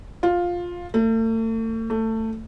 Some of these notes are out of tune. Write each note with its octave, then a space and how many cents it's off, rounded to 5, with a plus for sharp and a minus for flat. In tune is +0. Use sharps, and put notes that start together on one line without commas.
F4 +10
A3 +40
A3 +20